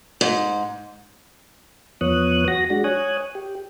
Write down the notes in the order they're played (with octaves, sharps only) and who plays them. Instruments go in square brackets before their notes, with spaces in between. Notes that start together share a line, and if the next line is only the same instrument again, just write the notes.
[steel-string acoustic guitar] G#2
[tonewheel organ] E2 F3 B3 C#5 D#6 F#6
F#4 A#6
G#3 D4 F#4
C#5 G#5 D#6 F#6
G4